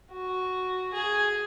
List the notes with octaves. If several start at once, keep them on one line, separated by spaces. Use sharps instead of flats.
F#4
G#4